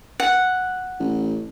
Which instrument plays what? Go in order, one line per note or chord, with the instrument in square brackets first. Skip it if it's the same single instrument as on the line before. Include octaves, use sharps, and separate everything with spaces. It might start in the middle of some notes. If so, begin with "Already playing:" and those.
[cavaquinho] F#5
[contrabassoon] A1